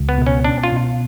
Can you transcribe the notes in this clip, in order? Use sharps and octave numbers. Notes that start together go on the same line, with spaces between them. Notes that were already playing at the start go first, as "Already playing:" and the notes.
Already playing: C#2
B3
B2
C#4
C#4 D4
F4
B2